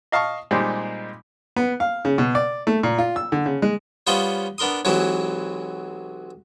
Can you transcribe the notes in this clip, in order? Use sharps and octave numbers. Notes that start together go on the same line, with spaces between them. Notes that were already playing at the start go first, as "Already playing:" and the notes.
D#5 F5 A5 C#6
A#2 G3 G#3 C4 D#4
B3
F5
C#3
B2
D5
A3
A#2
F4
E6
D3
C#3
G#3
G3 B3 C#4 F4 C5 D#5
B3 D4 A#4 C6 D#6
B1 C3 E3 F#3 G#3 C4